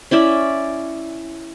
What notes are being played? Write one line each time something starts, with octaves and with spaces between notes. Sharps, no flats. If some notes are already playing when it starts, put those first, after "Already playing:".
C#4 E4 D5 E5